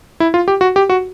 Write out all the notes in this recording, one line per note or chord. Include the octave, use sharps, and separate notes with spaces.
E4
F4
G4
F#4
G4
F#4